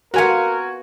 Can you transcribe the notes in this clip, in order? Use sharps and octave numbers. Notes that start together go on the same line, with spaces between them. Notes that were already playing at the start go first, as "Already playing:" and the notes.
B3 F4 F#4 A#4 G#5